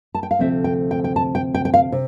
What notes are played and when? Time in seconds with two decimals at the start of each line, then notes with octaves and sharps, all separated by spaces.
0.15 A5
0.23 G5
0.31 F5
0.39 D2 C3 F3 A3 C4 E5
0.64 G5
0.91 G5
1.04 G5
1.16 A5
1.35 G5
1.55 G5
1.65 G5
1.74 F5
1.92 C3